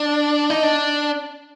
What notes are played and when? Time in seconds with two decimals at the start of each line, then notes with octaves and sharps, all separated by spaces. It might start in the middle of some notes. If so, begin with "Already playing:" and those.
Already playing: D4
0.50 D#4
0.63 D4